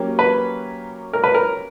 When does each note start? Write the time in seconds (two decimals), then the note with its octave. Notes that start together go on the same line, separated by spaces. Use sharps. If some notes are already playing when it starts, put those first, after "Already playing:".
Already playing: F#3 A#3 C#4 G4
0.19 B4
1.13 A#4
1.24 B4
1.34 A#4